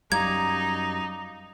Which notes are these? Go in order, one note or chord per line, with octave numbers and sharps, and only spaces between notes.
F#2 G3 D#4 F5 A#5 D6 G#6